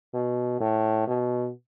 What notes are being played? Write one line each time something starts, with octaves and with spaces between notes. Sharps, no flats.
B2
A2
B2